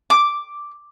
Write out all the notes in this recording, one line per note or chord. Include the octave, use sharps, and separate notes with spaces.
D6